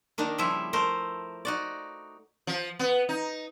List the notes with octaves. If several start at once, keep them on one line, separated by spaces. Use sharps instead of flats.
D#3 A#3 D4 D#4
C#3 F3 G3 E4 E5
A3 A#4 C5
D#4 F#4 D5
F3
B3
D#4